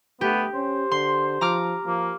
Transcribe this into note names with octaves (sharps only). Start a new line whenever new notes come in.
A3 B3 G4
C#4 C5
D3 C6
F3 A#5 D6 F6
F3 A#3